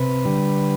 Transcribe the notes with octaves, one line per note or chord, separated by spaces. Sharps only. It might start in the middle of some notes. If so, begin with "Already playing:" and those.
Already playing: C3 B4
D3 G3